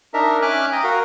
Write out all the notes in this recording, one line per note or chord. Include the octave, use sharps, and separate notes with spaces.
D4 D#4 A#4 E5
C#4 E5 G#5 D6 F6 F#6
G5 A#5 D#6
F#4 A#4 F5